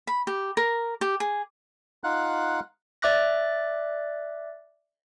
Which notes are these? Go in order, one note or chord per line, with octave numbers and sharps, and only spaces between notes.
B5
G4
A#4
G4
G#4
D#4 F4 F5 F#5 F#6
D5 E5 D6 F#6 A#6